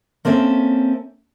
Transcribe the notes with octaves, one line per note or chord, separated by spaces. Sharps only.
A#3 C4 C#4 A4 E5